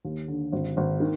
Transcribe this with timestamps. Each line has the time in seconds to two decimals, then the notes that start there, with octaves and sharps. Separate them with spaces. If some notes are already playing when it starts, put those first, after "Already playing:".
0.05 D#2
0.28 D3
0.52 G#1
0.77 G#1
1.00 D#3